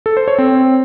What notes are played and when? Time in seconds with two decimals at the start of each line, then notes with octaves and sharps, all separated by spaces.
0.06 A4
0.17 C5
0.28 C#5
0.39 C4